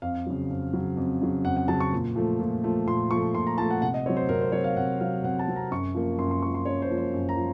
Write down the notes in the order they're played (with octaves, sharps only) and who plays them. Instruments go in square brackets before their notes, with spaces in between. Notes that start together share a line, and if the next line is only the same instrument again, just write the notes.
[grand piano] F2 F5
C#3 F#3
F2
C#3 F#3
F2
C#3 F#3
F2 F#5
F#5
C#3 F#3 A5
C#6
A#2
F3 A3
A#2
F3 A3
A#2 C6
F3 A3 C#6
A#2 C6
A#5
F3 A3 A5
F#5
C3 F#5
D#5
C4 C#5
F#3
C5
C3 A#4
C5
F#3 C4 C#5
F5
C3 F#5
F#3 C4 F5
C3 F#5
A5
F#3 C4
A#5
F#2 C#6
F3 A#3
F#2 C6
C6
A#3 C#6
F3
C6
F#2 C#5
C5
F3 A#3
C5
F#2
A#5
F3